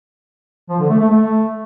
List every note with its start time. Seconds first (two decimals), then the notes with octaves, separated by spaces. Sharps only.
0.70 F3
0.80 D3
0.90 A3
1.00 A3
1.10 A3